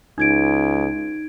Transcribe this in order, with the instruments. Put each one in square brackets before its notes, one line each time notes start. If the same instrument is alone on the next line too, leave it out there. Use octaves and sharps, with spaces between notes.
[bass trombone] C#2 [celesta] D#4 G#6 D7